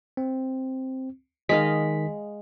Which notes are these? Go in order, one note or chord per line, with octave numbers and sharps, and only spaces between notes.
C4
D#3 G#3 D#5 F5 B6